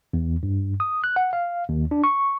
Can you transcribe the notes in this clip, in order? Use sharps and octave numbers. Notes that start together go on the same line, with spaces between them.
E2
G2
D#6
F#6
F#5
F5
D#2
D4
C#6